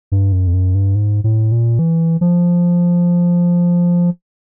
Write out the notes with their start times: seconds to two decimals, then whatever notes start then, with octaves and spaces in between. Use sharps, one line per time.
0.12 G2
0.32 F#2
0.47 F2
0.54 F#2
0.75 G2
0.95 G#2
1.24 A2
1.52 A#2
1.79 E3
2.21 F3